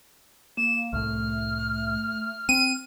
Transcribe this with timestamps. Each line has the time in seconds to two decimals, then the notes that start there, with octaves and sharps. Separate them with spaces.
0.57 A#3 E7
0.93 C2 A2 A3 F6
2.49 C4 D#7